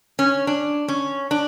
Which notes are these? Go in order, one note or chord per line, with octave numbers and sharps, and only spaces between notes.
C#4
D4
C#4
D4